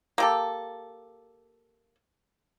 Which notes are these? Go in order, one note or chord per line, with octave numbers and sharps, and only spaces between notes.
A#3 G4 A4